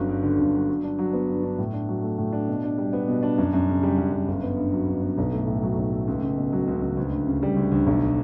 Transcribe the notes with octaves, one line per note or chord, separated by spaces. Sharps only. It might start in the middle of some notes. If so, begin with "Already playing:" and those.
Already playing: G1 F#3 C#4
G2
D3
G1
F#3
G2
D4
F#3
B3
G2
D4
A2
D4
F#3
A3
A2
D4
B2
D4
G3
B3
B2
D4
F#2
F#2
C#3
G3
F#2
F#2
G1
B3
G2
F#3
G1
B3
B1
A3
A2
F#3
B1
A3
C#2
C#2
B2
F#3
C#2
C#2
D2
D2
C#3
G3
D2
D2
B1